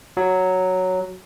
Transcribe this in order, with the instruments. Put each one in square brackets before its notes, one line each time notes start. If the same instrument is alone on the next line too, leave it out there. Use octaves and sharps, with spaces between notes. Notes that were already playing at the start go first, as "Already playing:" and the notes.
[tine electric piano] F#3